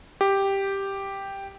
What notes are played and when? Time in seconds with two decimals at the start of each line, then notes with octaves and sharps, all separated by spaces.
0.21 G4